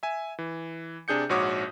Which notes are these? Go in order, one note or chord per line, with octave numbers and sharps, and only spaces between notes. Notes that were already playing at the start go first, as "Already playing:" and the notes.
E5 G#5
E3
C3 D4 G#4 G6 C#7
A#1 G#2 F#4 C#5 D6 D#6